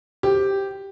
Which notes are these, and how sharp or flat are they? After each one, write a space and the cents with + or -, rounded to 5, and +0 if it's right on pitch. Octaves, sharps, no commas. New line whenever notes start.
G4 +0 C5 +0